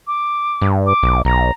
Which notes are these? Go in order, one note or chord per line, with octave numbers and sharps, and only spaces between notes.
D6
G2
D6
B1
B1 A#5